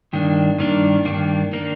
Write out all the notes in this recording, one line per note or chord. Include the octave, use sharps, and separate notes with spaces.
G2 D#3 A#3 D4
G2 D#3 A#3 D4
G2 D#3 A#3 D4
D#3 A#3 D4